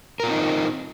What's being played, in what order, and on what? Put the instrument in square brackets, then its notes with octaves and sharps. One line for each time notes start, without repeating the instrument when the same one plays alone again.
[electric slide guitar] A#4
F4
C4
D#4